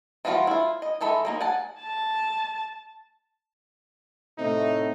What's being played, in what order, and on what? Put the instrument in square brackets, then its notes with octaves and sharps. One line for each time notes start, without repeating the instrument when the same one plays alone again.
[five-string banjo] E3 F3 G3 F4 F#4
E4 F4
D#5
D#3 G#3 A4 E5 B5
G3 G#3 A#3 D#4
F#5 G#5 A5
[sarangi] A5
[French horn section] A2 A3 [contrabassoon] C3 [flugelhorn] D#4